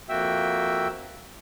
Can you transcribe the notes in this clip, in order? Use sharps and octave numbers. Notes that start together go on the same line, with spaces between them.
F2 A#3 F#4 E5 G5 E6